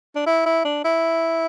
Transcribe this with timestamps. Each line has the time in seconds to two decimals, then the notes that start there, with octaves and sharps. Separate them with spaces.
0.16 D4
0.27 E4
0.46 E4
0.65 D4
0.85 E4